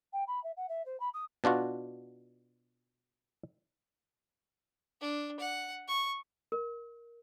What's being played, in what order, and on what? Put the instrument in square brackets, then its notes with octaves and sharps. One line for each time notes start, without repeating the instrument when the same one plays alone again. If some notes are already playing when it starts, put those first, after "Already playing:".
[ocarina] G5
B5
E5
F#5
E5
C5
B5
D#6
[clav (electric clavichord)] B2 D4 F4 F#4
[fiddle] D4
F#5
C#6
[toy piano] A#4